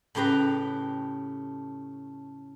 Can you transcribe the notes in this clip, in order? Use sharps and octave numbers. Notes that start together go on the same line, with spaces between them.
A2 C#3 G4 B4 A#5